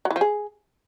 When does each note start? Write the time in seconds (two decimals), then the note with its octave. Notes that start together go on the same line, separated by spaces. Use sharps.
0.05 F#3
0.11 E3
0.16 F3
0.21 G#4